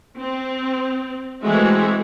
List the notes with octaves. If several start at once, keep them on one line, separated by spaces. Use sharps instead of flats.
C4
E3 G#3 A3 C4 F#4 E5